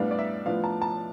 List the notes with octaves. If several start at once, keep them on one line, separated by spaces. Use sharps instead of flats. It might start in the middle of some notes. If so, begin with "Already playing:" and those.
Already playing: A2 G3 B3 D4 F5
D5
E5
A2 F3 B3 D4 F5
A5
A5